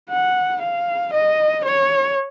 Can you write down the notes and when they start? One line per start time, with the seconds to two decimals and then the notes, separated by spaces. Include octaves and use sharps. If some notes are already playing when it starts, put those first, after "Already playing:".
0.10 F#5
0.62 F5
1.14 D#5
1.65 C#5